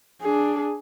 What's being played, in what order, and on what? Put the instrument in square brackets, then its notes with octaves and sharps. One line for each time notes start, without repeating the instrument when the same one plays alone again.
[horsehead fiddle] D4 G#4